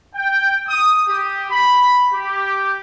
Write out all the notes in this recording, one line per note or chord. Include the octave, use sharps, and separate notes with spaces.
G5
D#6
G4
B5
G4